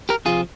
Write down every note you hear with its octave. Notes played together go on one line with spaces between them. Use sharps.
G4 A#4
F2 C3 F3 F4 G#4